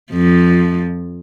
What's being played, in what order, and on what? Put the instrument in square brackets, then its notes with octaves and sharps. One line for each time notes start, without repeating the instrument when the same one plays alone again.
[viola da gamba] F2 F3